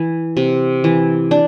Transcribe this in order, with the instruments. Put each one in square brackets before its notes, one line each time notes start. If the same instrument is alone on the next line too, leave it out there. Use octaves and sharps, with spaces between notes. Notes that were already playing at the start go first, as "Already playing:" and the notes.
Already playing: [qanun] E3
C3
E3
D4